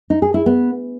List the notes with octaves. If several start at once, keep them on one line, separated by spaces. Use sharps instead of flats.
D#4
G#4
E4
B3